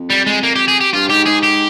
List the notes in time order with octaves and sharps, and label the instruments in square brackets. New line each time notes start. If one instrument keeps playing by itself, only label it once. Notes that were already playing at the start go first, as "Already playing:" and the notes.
Already playing: [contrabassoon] F2
[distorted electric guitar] G3
G#3
A#3
G4
G#4
G4
[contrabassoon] G2 [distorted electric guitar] F4
[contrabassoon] G#2 [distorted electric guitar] G4
[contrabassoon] G#2 [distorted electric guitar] G#4
[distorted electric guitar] G4